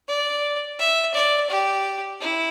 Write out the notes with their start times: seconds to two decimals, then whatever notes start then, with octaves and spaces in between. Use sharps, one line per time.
0.08 D5
0.80 E5
1.14 D5
1.50 G4
2.21 E4